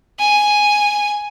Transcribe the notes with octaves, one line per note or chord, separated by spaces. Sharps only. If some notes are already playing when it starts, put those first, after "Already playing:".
G#5